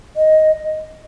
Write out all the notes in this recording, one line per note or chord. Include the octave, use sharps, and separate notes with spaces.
D#5